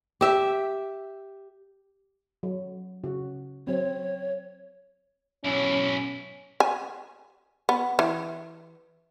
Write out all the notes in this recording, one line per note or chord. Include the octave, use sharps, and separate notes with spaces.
G4 E5
F#3
C#3 F#4
F#3 C4 C#5
B1 C#4 E4
G#5
B3
E3